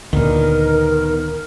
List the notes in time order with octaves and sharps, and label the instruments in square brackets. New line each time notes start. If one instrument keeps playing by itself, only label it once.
[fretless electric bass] D2 A#2 [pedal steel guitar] D#3 B3 D#4 [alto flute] A#4